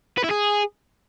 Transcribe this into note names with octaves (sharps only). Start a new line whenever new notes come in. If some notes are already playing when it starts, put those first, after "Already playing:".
B4
E4
G#4